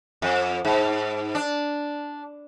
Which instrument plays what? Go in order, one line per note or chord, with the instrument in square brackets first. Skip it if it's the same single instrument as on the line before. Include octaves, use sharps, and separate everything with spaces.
[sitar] F2
G#2
D4